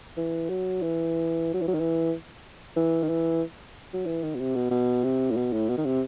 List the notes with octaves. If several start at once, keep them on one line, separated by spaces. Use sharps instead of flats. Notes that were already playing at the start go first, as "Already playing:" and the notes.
E3
F#3
E3
F#3
E3
F#3
D#3
E3
E3
D#3
E3
F#3
E3
D#3
B2
C3
B2
B2
C3
A2
B2
A2
B2
D#3
C3